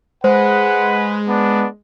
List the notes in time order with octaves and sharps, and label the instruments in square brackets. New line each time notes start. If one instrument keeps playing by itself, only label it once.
[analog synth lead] G#3 [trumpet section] B4 [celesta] C5 [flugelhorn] F#5
[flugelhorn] B3 [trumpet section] D4